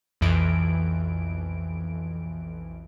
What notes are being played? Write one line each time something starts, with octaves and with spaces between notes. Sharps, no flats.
B1 F2 E3 D7